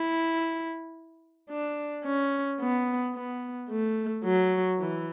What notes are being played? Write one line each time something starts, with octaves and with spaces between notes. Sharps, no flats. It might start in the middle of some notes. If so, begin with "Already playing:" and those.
Already playing: E4
D4
C#4
B3
B3
A3
F#3
E3